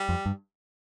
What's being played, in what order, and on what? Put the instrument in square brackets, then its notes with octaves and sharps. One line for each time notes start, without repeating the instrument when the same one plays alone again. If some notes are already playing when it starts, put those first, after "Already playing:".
Already playing: [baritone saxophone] G3
[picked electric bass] F2
G2